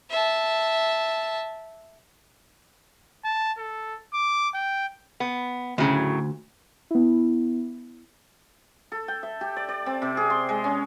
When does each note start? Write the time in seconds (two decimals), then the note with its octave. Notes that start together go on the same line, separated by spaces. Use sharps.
0.10 E5 A5
3.25 A5
3.58 A4
4.14 D6
4.54 G5
5.20 B3
5.78 D2 A2 C#3 F#3
6.91 B3 E4
8.92 A4
9.08 G5
9.23 E5
9.41 G4
9.56 D5
9.68 D5
9.86 C4
10.02 C3
10.17 G#4
10.30 C6
10.49 G#3
10.64 C#4